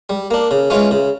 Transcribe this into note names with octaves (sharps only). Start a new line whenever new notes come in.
G3
A#3 D4
C#3
E3 G#3 C#4 F4
C#3